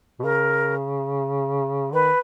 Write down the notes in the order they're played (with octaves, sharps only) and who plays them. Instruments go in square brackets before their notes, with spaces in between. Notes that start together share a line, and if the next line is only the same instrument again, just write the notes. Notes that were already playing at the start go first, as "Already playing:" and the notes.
[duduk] B2
[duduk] C#3 [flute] A#4
[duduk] D#3 [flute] B4